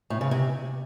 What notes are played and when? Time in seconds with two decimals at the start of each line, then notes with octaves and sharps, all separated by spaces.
0.10 A2
0.21 C#3
0.31 C3